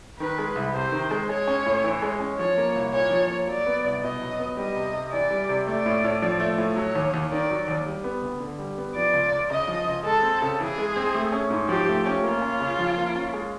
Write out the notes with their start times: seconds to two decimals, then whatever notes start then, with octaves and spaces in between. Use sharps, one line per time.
0.19 D#3 B4
0.38 G#3
0.55 C2
0.75 C3 C5
0.92 D#3
1.11 G#3
1.29 G#3 C#5
1.47 C#4
1.66 A2
1.84 E3
2.02 G#3
2.20 C#4
2.38 F3 C#5
2.57 A#3
2.75 C2
2.93 A#2 C#5
3.11 F3
3.30 A#3
3.47 F#3 D5
3.66 B3
3.84 C2
4.03 B2 D#5
4.22 F#3
4.39 B3
4.57 G3 D#5
4.76 C3
4.94 C3
5.12 E3 D5
5.31 G3
5.49 C3
5.67 A3 D5
5.86 A2
6.04 A2
6.22 F3
6.40 A3
6.58 A2
6.76 F#3 C#5
6.95 D#2
7.14 D#2
7.32 D#3 D5
7.50 F#3
7.68 D#2
7.86 G3
8.04 B3
8.22 D2
8.40 D3
8.59 G3
8.78 B3
8.95 F3 D5
9.13 C#2
9.32 C#2
9.50 C#3 D#5
9.68 F3
9.87 C#2
10.05 G#3 A4
10.23 C4
10.42 C#3
10.60 E3 G#4
10.78 G#3
10.96 C4
11.15 A3
11.32 C#4
11.50 G#2
11.69 F3 G4
11.88 A3
12.06 C#4
12.23 A#3 F4
12.42 C#4
12.60 C#3
12.79 F3
12.97 A#3
13.15 C#4
13.33 G#3